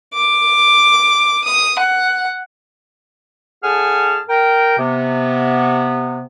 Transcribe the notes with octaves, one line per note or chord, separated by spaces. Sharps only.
D6
D#6
F#5
A2 G#4 F#5 G#5 A5 F6
A#4 G5
C3 B3